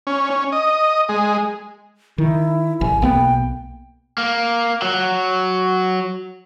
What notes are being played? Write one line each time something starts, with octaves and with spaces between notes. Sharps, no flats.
C#4
C#4
D#5
G#3
D#3 E4
A1 G#5
B1 A#3 B3 G5
A#3
F#3